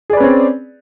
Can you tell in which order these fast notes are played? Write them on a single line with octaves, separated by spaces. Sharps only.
G#4 D5 B4 C#4 C4